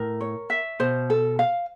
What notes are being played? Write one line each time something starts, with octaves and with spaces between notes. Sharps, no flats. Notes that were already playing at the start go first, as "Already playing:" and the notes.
Already playing: A2 A#4
C#5
E5
B2 C5
A4
F5